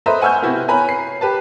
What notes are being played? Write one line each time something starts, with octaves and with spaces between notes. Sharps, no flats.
A4 B4 C5 D#5 E5 A#5
F#5 G#5 C#6 E6 F6 G6
C3 B3 E4 F#4 B4
B4 C#5 G#5 A#5 B5
C7
G4 B4 A5